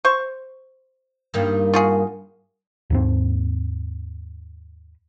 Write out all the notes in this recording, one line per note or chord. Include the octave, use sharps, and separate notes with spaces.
C5 C#6
G2 D#3 A#3
F4 F#4 G#4
D#2 G#2 C4